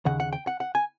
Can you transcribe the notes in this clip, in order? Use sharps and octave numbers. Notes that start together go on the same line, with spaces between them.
D#2 C#3 F#5
F#5
G5
F#5
F#5
G#5